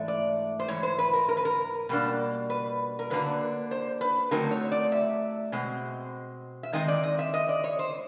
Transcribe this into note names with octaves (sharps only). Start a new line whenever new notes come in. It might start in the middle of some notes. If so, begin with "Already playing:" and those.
Already playing: G#2 E3 A3 D4
D5
C5
G#2 E3 C#5
C5
B4
A#4
A#4
B4
A#4
B2 G3 A#3 D4
B4
A#4
D3 F#3 A#3 D4 B4
C5
B4
D3 F#3 A3 C4 D#4 A#4
C#5
D5
E5
B2 G#3 C4
E5
D#3 G#3 C4 D#4 D#5
D5
D#5
E5
D#5
D5
C#5
C5